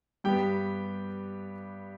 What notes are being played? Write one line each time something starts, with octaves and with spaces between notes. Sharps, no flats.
G2 G3 B3 G4 G5